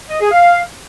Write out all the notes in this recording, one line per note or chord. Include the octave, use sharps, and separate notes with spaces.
D#5
G#4
F5